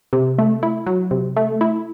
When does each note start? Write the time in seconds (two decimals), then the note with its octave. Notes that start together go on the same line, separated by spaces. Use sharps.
0.13 C3
0.38 A3
0.63 E4
0.86 F#3
1.11 C3
1.36 A3
1.61 E4